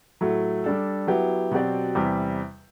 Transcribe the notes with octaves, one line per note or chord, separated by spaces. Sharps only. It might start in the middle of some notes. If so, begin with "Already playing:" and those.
A2 F#3 A3
G3 D4 A4
F#3 B3 E4 G4
B2 F#3 C4 G4 D5
E2 C3 G3